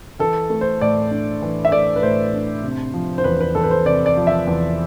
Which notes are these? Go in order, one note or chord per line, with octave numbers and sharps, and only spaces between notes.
E3 A4
A3
C5
A2 D5
D4
E3
E5
A3 D5
B4
A2 C5
D4
C3
F3
C5
E2 B4
B4
E2 A4
B4
C5
C3 D5
D5
F3
E5
E2